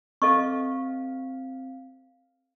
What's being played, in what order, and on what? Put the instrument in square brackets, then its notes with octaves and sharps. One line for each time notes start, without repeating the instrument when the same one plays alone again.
[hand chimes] C4 F5 [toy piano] A4 D#5 C#6